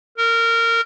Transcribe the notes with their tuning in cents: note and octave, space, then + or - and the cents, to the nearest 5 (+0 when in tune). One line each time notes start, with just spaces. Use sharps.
A#4 -20